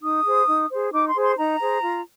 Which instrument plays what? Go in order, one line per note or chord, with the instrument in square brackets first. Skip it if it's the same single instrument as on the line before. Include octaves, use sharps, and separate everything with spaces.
[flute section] D#4 D#6
G#4 C5
D#4
G#4 C5
D#4 D6
C6
G#4 C5
C6
D#4 A#5
G#4 C5
F4